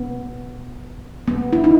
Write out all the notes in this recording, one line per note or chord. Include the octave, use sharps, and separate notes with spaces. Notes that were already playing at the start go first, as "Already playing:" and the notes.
Already playing: B3
B3
E4
D#4